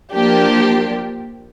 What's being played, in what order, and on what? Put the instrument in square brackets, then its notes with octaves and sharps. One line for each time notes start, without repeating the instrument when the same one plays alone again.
[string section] F3 A#3 D4 G4